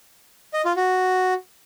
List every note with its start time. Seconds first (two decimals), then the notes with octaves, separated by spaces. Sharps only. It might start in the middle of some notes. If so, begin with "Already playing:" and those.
0.54 D#5
0.65 F4
0.77 F#4